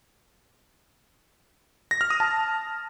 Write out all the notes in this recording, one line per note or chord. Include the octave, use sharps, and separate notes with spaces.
A#6
F6
D#6
A5